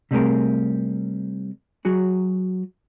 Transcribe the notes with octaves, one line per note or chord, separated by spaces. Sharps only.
C3 G3 A3 C4 G#4 A#4
F#3 F#4 G#4